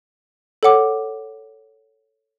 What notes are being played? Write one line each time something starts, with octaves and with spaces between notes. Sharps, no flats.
A4 C#5 F#5 D6